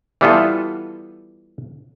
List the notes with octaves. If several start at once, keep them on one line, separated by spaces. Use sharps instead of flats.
E3 G3 B3 F4 A4